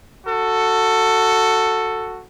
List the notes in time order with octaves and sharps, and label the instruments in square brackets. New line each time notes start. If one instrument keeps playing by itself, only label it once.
[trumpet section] F#4 A4